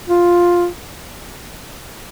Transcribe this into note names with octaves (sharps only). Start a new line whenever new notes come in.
F4